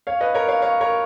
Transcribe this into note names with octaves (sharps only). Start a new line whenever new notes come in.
C#5 F5
B4 D#5
A#4 C#5
C#5 F5
C#5 F5
A#4 C#5